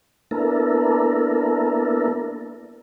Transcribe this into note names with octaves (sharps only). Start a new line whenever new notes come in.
A#3 B3 D4 E4 A4 A#4